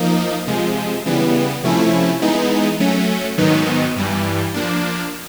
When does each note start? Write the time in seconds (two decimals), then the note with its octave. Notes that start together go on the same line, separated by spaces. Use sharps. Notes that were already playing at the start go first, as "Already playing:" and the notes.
Already playing: F3 A#3 D#4
0.47 C3 F3 G#3
1.06 C#3 E3 G3 B3
1.64 C3 F3 A3 C#4 E4
2.22 E3 G#3 B3 D#4
2.80 F#3 A3 C#4
3.38 G#2 D#3 F#3 B3 D#4
3.96 G2 E3 G3
4.54 F3 A#3 D4